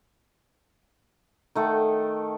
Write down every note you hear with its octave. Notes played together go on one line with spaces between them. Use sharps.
D#3 A3 F#5 G5